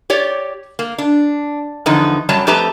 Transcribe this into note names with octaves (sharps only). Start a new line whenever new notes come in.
G4 C#5 D5
A#3
D4
E2 D3 F3 B3 D#4
F#2 F#3 G3 C#5 A5
F2 A3 G4 B4 A5 A#5